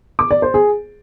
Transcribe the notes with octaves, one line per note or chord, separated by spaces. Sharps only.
D6
D5
C5
G#4